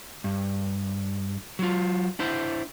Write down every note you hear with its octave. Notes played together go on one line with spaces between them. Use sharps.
G2
F#3 F4
D4 E4 C5